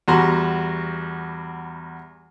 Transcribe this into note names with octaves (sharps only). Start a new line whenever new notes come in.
E2 G3 F#4 A#5 C6